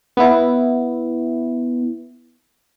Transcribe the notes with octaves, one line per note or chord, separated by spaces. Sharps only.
B3 E4